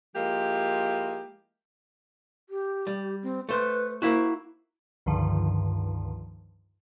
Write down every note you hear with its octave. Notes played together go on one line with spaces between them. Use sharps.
F3 G#3 A#3 E4 G4
G4
G3
C4
A3 B4 C5
A#3 E4 F#4 C5
C#2 G2 D3 D#3 F3